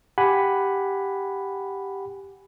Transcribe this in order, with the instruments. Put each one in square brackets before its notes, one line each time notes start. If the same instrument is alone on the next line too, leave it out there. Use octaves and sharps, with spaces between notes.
[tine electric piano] G4 F#5 G#5 B5